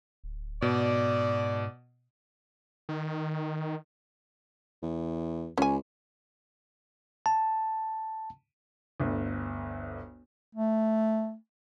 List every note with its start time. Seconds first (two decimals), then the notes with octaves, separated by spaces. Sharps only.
0.24 D1
0.62 G#2 B2 D5
2.89 D#3
4.83 E2
5.58 C#2 C#4 G#5
7.26 A5
9.00 G1 D2
10.55 A3